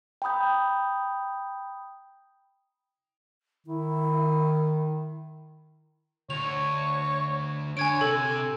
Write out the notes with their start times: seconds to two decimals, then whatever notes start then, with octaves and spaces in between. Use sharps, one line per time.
0.22 G5 A#5 B5 D#6 G6
3.67 D#3 E4
6.30 D2 C#5 F7
7.77 D3 C#5 G#5 G#6 D7
8.01 C3 A4 G#5